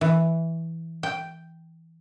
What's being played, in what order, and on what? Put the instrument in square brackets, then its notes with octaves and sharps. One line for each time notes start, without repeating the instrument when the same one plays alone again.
[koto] E3
G5